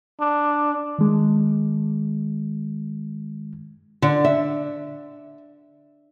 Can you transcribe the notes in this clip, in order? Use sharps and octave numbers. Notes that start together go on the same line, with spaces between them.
D4
D#3 G#3
D3
E5